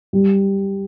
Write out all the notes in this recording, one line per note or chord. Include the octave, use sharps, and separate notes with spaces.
G3